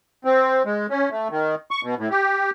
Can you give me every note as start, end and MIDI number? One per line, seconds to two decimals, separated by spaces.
0.25 0.63 60
0.65 0.86 56
0.90 1.09 61
1.10 1.28 57
1.30 1.55 51
1.71 1.81 85
1.83 1.95 47
1.98 2.09 45
2.11 2.50 67